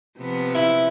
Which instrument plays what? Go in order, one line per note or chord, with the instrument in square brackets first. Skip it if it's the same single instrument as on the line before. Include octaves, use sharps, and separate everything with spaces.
[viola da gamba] C3 F3 B3
[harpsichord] E4